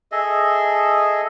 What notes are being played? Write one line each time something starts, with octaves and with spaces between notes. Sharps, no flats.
G#4 A4 D#5 E5